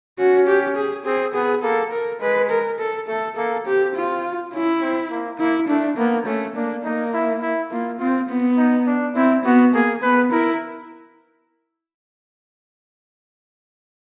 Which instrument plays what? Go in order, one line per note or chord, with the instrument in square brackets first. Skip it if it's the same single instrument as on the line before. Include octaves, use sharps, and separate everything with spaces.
[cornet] C#4 [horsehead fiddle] F#4
[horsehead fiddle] G4
G#4
[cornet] C4 [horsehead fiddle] G#4
[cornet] B3 [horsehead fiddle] G#4
[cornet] A#3 [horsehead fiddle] A4
[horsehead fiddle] A#4
[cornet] G#3 [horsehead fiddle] B4
[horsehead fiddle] A#4
A4
[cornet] A3 [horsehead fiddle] A4
[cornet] A#3 [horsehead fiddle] A4
[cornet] C4 [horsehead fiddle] G4
[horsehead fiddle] F4
[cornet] C#4 [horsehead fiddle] E4
[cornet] C4
A#3
[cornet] A#3 [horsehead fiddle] E4
[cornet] A3 [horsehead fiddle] D4
[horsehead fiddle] A#3 [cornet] B3
[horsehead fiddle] A3 [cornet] C#4
[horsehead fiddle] A#3 [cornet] D4
[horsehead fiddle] A#3 [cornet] D#4
[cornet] E4
E4
[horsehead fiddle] A#3 [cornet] F4
[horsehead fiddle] C4 [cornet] F4
[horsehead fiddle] B3
[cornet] D#4
D4
[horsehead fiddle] C4 [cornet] E4
[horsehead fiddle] B3 [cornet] F#4
[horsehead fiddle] A#3 [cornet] G#4
[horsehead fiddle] B3 [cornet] B4
[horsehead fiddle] E4 [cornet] A#4